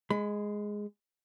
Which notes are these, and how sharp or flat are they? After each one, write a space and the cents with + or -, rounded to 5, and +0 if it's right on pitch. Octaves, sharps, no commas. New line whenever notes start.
G#3 +0 B5 +35